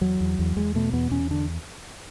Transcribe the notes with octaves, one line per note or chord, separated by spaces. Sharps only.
E2 F#3
E2
E2
E2 G#3
B2 A3
E2 B3
E2 C#4
D3 D4